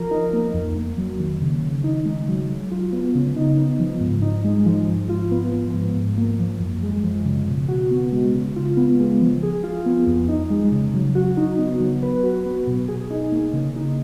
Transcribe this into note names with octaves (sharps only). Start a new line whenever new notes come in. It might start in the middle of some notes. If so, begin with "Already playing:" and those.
Already playing: F3 A#4
D#4
A#3
F2
A#3
F#3
D#3
C#3
C#3
D#4
G#3
F#3
F#3
F4
B3
C#3
D#4
B3
F3
G#2
D#4
G#3
F3
G#2
F4
B3
F3
G#2
G#2
A#3
F3
F#2
G#3
F3
C#3
B2
F#4
B3
G#3
C#3
F4
B3
G#3
F3
G#4
F4
B3
F2
D#4
G#3
C#3
F#3
F#4
D#4
B3
F#3
B4
F#4
B3
B2
G#4
D#4
A#3
C#3
D#4